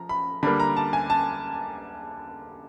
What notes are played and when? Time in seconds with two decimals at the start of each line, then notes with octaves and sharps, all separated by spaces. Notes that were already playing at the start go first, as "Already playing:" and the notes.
Already playing: F3 A#5
0.09 B5
0.43 D3 G3 A#3 B5
0.60 A#5
0.77 A5
0.93 G#5
1.10 A5